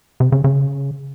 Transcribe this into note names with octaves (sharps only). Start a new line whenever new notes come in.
C3
C#3
C#3